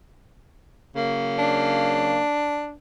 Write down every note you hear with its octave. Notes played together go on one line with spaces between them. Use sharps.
C#3 F#3 A#3
D4